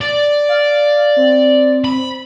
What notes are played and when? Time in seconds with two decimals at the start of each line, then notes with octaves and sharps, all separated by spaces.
0.01 D5
0.49 F5
1.16 C4
1.84 B5